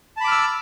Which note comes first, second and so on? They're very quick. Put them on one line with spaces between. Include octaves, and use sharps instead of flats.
A5 B5 D6 F6 E6